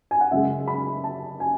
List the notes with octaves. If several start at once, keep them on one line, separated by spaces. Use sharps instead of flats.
G#5
F#5
F#2 C#3 G#3 E5
B5
A5
G#5